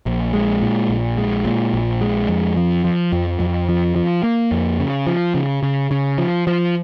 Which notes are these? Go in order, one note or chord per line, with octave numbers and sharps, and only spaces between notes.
A#1
G#3
A#2
A#1
G#3
A#2
A#1
G#3
F2
F3
F3
F2
F2
F3
F3
A#3
F2
C#3
F3
C#3
C#3
C#3
F3
F3